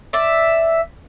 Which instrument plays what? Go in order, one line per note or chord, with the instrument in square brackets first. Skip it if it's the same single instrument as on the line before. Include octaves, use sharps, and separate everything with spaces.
[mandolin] D5 E5